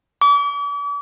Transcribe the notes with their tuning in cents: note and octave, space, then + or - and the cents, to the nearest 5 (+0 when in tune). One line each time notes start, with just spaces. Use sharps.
D6 -45